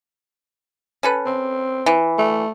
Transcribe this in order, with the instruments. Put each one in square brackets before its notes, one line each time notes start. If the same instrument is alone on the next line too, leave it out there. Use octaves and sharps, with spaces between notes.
[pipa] C#4 A4 B4
[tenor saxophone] C4
[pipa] E3
[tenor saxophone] A3